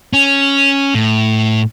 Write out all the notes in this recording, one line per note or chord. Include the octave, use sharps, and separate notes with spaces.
C#4
A2